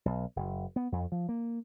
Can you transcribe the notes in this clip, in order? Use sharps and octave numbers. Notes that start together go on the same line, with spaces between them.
B1
F#1
B3
F2
F3
A#3